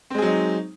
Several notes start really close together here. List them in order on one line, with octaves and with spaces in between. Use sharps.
C4 G#3 G#4 F#3 D#4